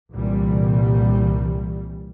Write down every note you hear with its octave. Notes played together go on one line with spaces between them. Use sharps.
C2 A#2 E3 G3